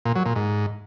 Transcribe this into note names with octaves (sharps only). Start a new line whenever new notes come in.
A#2
F#3
A#2
G#2